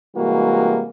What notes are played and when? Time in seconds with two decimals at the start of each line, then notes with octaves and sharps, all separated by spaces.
0.15 C3 E3 G3 G#3 A#3 F#4